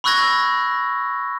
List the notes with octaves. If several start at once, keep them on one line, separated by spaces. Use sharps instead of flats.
B5 C#6 E6 F#6 G#6 A#6